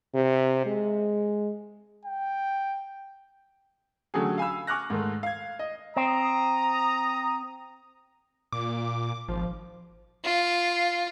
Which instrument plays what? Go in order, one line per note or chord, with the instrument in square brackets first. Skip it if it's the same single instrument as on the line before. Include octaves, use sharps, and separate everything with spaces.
[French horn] C3
G#3
[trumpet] G5
[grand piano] D3 F#3 A3 C#4 G4 G#4
F5 G#5 B5 E6
G#5 C#6 D6 F6 F#6 A#6
G#2 D#3 A3
F5 G#6
D#5
[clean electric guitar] C4 [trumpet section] A#5 D#6
[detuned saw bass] A#2 [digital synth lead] D6
[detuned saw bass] G#1 [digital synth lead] F3
[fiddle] F4